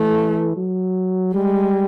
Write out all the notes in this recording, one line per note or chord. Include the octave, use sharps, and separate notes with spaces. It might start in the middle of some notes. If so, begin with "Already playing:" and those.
Already playing: E3 A3
F#3
G3 G#3